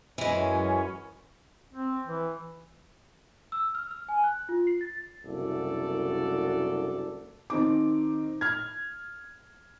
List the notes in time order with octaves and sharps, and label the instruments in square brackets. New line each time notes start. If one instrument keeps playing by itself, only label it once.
[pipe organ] F#2 C#4 [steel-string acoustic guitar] E3 G#3
[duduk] C4
E3
[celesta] E6
F6
F6
G#5
F#6
F4
C7
A6
[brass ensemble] F#1 C2 D4 F#4 A4 D5
[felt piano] D#3 C4 D#4 D6
F6 G#6